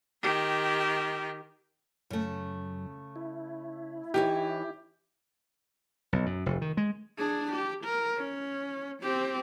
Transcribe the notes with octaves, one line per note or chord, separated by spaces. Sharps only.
D#3 G4
F#2 C#3 A3
E4
E3 D#4 G4 C#5
B1
F#2
F1
D#3
G#3
D4 G#4
G4
A#4
C#4
C4 G4